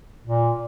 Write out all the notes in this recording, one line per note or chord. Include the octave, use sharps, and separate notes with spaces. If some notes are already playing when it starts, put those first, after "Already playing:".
A#2